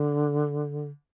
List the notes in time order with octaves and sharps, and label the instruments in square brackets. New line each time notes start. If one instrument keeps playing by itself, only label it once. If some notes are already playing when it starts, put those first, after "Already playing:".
Already playing: [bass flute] D3